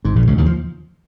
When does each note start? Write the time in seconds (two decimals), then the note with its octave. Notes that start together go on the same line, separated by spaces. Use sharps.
0.04 G#1 G#2
0.16 A#1 A#2
0.27 C#2 C#3
0.38 D#2 D#3
0.46 F3